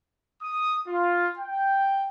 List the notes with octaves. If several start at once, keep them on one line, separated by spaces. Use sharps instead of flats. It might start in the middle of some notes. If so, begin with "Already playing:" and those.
D#6
F4
G5